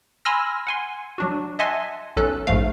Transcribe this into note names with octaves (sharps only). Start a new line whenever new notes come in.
G#5 B5 C6 E6 F6 A#6
F#5 G#5 C6
F#3 D4 F#4
D#5 E5 F#5 G#5 A5 C6
B1 F#3 C#4 A4 F#6
A#1 G#2 A3 F5